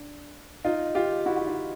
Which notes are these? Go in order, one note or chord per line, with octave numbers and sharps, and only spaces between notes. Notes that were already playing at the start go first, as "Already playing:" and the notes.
Already playing: D4
D#4 F4
F4 G4
E4 F#4
F#4
D#4 F4